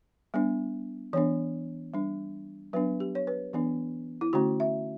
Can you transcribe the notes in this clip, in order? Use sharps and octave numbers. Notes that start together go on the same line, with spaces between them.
G3 B3 D4
E3 B3 D4 C#5
G3 D4
F#3 B3 D4 B4
G4
C#5
B4
E3 B3 D4
E4
D3 A3 C#4 F#4
E5